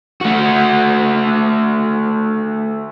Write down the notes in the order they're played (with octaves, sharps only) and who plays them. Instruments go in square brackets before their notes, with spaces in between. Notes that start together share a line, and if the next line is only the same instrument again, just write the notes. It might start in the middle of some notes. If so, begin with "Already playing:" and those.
[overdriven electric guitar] A3 F#4